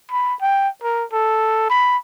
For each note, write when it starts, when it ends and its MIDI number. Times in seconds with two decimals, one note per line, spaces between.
0.11 0.34 83
0.41 0.69 79
0.83 1.04 70
1.13 1.67 69
1.70 1.98 83